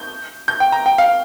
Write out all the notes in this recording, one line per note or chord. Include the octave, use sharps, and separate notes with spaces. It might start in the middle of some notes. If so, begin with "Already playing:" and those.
Already playing: G6
G6
G5
A#5
G5
F5